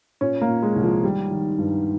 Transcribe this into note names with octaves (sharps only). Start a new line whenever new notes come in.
A#2 C#4
A#3
A#2
G#3
C2
F3
D#3 G3
D#3
G2